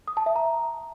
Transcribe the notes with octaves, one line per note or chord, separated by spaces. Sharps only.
D#6
A5
E5
A#5